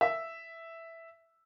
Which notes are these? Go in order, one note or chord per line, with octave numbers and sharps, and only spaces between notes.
E5